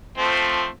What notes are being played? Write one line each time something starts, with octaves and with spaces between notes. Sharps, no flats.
F3 A3 C4